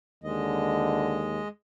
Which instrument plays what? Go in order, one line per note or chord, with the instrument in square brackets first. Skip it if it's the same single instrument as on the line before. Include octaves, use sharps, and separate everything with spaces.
[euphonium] D#2 [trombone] D3 [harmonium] G#3 D#5